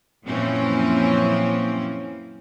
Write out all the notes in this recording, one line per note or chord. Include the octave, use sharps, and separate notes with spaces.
F#2 A#2 E3 F3 C4 C#4